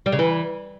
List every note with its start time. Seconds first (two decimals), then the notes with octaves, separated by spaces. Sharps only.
0.06 G3
0.12 C#3
0.19 E3